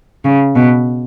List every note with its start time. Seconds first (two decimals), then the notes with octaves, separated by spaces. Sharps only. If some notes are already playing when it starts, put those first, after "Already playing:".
0.25 C#3
0.55 B2